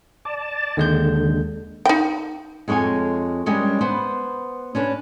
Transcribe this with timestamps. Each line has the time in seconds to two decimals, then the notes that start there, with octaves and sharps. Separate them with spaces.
0.25 D5 A5
0.77 D#2 D3 G#3 G6
1.85 D#4 G5
2.68 F2 G#3 C#5 F5 G#5
3.46 G3 G#3 C#4 D4 A#4
3.81 B3 B4 C5
4.75 C#4 D4 B4